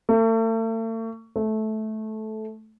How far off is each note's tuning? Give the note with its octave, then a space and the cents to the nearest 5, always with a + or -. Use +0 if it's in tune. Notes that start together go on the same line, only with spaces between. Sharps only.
A3 +40
A3 -15